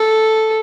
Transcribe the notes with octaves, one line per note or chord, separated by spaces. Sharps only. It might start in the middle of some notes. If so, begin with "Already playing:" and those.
Already playing: A4